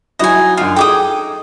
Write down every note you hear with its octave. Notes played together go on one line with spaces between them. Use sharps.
F#3 D#4 E4 D#5 G#5
F#2 D4 F4 F6
D#4 G#4 A4 G5 D6 D#6